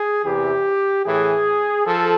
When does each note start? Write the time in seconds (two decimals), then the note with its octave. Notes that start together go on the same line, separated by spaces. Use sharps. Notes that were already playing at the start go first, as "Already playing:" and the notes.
Already playing: G#4
0.24 E2 C3 E3 G4
1.05 A2 E3 G#4
1.86 F3 A4